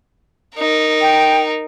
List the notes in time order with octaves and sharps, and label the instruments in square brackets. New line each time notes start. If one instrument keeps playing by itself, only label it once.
[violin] D#4 A#4
[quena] G5